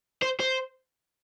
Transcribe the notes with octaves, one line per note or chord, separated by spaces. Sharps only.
C5
C5